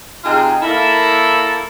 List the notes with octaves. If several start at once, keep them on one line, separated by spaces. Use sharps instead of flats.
C3 D#4 F4 G#4
A#3 E4 A4